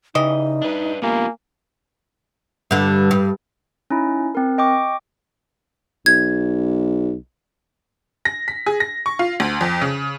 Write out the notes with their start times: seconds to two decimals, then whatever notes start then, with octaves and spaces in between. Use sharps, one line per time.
0.15 C#3 E3 G3 D#4 D#5
0.62 D4 B4
1.02 A#3 B3 F4 G4 G#5
2.71 G2 D3
3.11 G2
3.90 C#4 D#4 E4
4.35 C4 A#4
4.58 D#5 G5 C#6 D6
6.06 B1 G#6
8.25 A#6
8.48 B6
8.66 G#4
8.80 A#6
9.06 C#6
9.19 F4
9.40 D2
9.61 F2
9.82 C#3